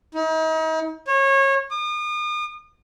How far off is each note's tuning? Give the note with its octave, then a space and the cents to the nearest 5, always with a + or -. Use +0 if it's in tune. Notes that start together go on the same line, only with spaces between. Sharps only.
D#4 +40
C#5 -25
D#6 -40